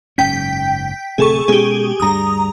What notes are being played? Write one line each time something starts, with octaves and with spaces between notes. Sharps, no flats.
F#1 G#2 C#4 G5 G6 B6
D1 C3 A3 G#4 A4 C#6
B2 G#3 C#4 G4 G#4
D2 G2 G3 A#5 D#6